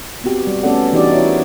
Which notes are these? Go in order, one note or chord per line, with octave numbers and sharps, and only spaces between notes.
B3 C4 F#4 G4
G3
A3 B3 C#4 A4 D5 F#5
E3 D4 D#4 F#4 G4 D5
E4 F#4 C#5 E5
A#4